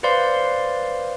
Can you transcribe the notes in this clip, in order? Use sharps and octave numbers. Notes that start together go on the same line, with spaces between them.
B4 C5 D5 F5 C6